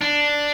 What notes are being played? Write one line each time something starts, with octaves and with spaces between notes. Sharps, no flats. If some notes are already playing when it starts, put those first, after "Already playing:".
D4